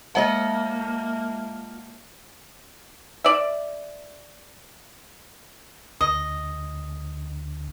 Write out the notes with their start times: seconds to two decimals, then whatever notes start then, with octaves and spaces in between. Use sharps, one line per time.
0.15 G#3 A#3 F4 D#5 E5 F#5 A5
3.24 D5 E5
6.01 D2 D#5